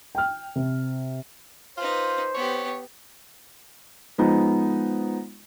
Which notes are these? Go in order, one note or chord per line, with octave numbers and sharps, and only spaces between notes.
G5 F6
C3
D#4 F4 B4 C5
B3 G4 C#5
F3 G#3 B3 D#4